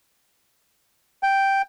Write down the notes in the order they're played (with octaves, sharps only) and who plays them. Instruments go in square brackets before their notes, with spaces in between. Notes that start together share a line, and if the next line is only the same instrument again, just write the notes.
[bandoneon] G5